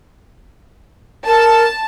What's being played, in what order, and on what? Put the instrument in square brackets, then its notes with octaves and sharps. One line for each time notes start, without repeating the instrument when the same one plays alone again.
[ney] A#4 [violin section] A5